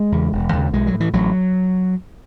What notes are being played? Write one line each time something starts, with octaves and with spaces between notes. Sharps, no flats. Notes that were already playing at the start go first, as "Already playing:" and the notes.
Already playing: G#3
E2 C#3
E1
D#2 C#3
B1 G#3
F#3
A2
E3
A1 F#3